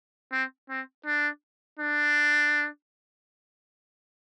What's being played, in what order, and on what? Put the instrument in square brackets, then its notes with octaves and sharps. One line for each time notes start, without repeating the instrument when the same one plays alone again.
[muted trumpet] C4
C4
D4
D4